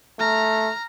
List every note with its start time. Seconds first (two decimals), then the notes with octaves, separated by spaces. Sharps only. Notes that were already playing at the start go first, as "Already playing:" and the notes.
0.19 A3 A#5 F6